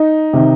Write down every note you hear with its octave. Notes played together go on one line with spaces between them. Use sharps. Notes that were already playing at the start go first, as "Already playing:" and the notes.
Already playing: D#4
C3 D#3